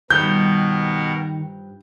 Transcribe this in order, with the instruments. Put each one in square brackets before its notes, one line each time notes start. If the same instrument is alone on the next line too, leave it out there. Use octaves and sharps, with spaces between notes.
[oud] G2 F3 [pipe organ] B2 B3 A#4 [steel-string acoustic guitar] D#3 [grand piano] G6